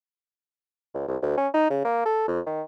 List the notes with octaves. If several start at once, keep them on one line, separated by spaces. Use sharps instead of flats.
C#2
C2
D2
C#4
D#4
C#3
A#3
A4
F2
D#3